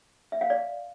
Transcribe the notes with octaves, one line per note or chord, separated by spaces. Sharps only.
E5
F5
D5